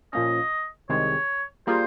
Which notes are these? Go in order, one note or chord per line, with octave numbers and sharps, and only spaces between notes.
A#2 F3 A#3 C#4 D#5
C2 C3 D#3 G#3 C4 C#5
G3 A#3 F4 G#4 C5